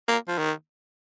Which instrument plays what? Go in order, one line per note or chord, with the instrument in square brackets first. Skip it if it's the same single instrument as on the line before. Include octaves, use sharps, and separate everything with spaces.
[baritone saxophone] A#3
F3
D#3